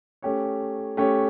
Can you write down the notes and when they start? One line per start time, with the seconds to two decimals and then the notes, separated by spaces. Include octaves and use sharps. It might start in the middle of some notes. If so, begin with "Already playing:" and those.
0.22 A3 C#4 G4 C#5
0.97 A3 C#4 G4 C#5